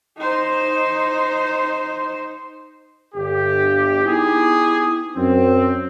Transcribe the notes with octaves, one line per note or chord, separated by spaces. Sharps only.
D#4 C5
G1 G4
B3 D#4 E4 G4 G#4
F#2 C4